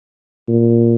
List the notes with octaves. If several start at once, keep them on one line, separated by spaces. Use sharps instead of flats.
A#2